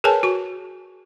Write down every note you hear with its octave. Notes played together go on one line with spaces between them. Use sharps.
G#4 A#4 B4 C#5 G#5 A5
F#4 C#6